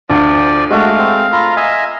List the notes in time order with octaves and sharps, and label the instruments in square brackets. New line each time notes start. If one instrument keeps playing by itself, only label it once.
[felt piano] D2 [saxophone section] F3 [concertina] D5
[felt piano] G#3 A3 [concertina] F#4 [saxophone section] A#4 F5
[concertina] C4
[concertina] F4 A#5 [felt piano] B5
[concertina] D#5 E5 G#5